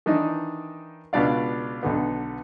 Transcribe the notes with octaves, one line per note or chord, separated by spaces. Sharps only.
D#3 E3 D4 D#4
C#2 B2 D4 D5 F5
B1 D3 B3